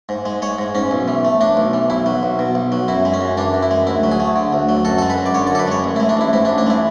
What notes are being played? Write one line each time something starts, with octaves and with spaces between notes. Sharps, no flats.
G#2
G#3
G#3 C#5
G#2
G#2 C#4
B1
E3
A3
A2 D4
B1
E3
B1 E4
F#3
B1
B2
B1
F#3
F#2 E4
G#3
C#4
F#2
E3 D4
F#2
E4
G#3
D2 E4
F#3
G#4
A3
D3
D2
F#3
F#2 A4
G#3 A4
B4
F#2
D5
D3 C#5
D5
F#2 A4
B4
G#3 C#5
A1
E4
G#3
D4
A1 E4
G#2 E4
D4
A1
D4
G#3 E4